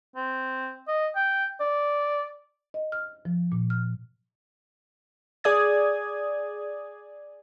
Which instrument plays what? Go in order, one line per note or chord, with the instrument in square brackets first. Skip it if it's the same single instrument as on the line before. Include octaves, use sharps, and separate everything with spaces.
[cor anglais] C4
D#5
G5
D5
[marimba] D#5
F6
F3
A#2
F6
[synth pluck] G#4 D5 D#6 G#6